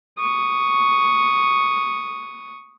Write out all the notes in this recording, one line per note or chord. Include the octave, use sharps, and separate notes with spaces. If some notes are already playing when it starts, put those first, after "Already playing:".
C#6 D#6